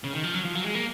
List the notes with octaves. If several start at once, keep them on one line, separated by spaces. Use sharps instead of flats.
C#3
D#3
F3
F#3
F3
F#3
G#3
A#3